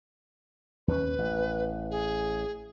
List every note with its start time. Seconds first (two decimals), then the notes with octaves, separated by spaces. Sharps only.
0.88 D#2 C#4 B4
1.18 A1
1.91 G#4